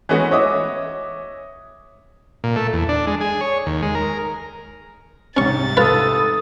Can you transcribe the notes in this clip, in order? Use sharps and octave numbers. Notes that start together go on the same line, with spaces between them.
E3 G#3 A3 B3 C#4 F#4
C#5 D#5 E5 D6 D#6
A#2
A3
E2
D4
G#3
G#4
C#5
D#2
G#3
A#4
C2 G#2 C3 C#4 C#6 A6
F4 A4 B4 D#6